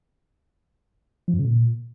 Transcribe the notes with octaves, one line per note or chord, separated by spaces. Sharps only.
F3
F#2
C#3
A#2